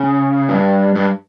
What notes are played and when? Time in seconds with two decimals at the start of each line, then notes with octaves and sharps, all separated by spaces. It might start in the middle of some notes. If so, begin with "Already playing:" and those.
Already playing: C#3
0.49 G2
0.95 G2